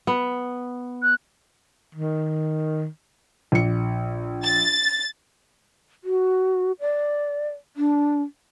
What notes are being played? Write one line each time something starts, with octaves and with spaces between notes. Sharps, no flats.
B3
F#6
D#3
A#1 C#7
A6
F#4
D5
D4